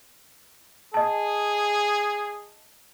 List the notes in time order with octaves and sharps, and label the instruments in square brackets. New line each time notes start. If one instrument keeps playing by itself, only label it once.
[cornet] G#4 [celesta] D#5 A5